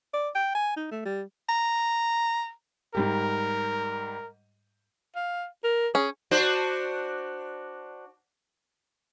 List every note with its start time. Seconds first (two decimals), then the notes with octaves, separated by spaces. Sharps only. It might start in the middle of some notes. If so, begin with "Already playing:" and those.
0.14 D5
0.35 G5
0.55 G#5
0.76 D#4
0.91 A3
1.05 G3
1.49 A#5
2.95 G#2 G3 G4 A#4
5.16 F5
5.64 A#4
5.95 C#4 G#4
6.31 D4 F#4 C5